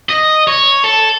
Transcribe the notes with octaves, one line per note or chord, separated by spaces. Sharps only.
D#5
C#5
A4